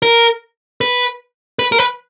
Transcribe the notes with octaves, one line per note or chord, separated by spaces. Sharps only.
A#4
B4
B4
A#4
B4